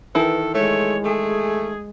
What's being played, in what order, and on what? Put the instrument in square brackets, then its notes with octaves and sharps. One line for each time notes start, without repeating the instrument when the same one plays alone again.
[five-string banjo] D#3 E3 E4 [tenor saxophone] A4 [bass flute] B4
[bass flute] G#3 [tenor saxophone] A3 [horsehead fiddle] C#5
[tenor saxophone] A3 [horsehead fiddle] G#4